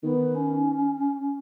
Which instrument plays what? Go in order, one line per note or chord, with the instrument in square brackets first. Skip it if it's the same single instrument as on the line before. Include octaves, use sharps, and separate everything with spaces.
[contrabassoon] D#3 [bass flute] B3
[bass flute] C#4